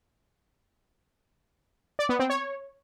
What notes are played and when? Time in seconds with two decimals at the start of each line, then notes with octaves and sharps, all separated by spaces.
1.99 D5
2.09 B3
2.19 C4
2.30 C#5